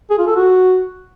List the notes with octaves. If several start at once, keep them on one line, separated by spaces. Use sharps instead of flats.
G#4
F4
A4
F#4